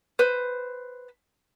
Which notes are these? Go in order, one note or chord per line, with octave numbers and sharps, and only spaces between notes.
B4 C5